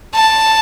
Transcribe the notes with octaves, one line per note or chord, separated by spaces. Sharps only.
A5